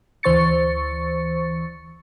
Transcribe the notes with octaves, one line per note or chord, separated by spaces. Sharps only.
D2 E3 C5 C#6 A6 C#7